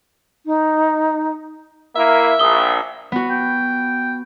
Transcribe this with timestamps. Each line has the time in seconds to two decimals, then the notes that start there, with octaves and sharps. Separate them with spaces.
0.46 D#4
1.96 A#3 E4 A#4 E5
2.39 A#1 D#6 G7
3.12 B3 F#4
3.30 G5